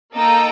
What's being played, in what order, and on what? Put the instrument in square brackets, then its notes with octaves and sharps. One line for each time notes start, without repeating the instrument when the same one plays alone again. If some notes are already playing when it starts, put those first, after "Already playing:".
[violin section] A#3 D#4 A4 D#5 G5